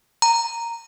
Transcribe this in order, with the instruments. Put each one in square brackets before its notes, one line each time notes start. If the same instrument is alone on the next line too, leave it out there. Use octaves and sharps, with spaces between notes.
[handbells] A#5